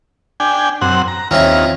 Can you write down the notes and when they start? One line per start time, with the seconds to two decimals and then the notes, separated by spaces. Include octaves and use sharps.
0.40 D4 G5 G#5
0.81 F#2 C4 F#5
1.08 A#5
1.31 D#2 C4 C#4 E4 F4 A#5